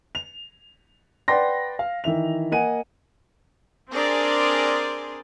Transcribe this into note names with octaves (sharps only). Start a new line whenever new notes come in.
F7
B4 D5 F#5 G5 C6 A#6
F5
D#3 E3 E5 F7
A#3 D#5 F#5 G#5 D#7
C4 D4 G#4 A#4 D5 C6